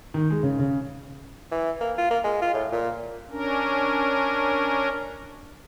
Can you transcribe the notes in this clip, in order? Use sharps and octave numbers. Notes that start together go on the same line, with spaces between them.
D#3
G#3
C#3
C#3
E3
A#3
F4
A#3
G#3
F4
A2
A#2
C#4 D4 A#4